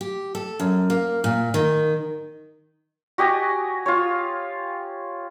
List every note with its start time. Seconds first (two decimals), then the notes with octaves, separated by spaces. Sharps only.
0.01 G4
0.35 A4
0.60 F#2
0.90 A#3
1.24 A#2
1.54 D#3
3.18 F#4 G4 D#5 G#5
3.86 F4 C#5